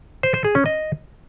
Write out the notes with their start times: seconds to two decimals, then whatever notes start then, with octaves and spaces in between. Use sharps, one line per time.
0.23 C5
0.34 C5
0.44 G#4
0.55 C#4
0.66 D#5